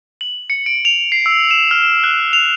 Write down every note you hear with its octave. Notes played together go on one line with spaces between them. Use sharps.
F#7
C#7
D7
F7
C7
E6
E7
F6
E7
F#6
F7